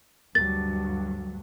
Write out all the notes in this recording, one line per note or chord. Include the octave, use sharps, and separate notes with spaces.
D2 G2 F#3 A6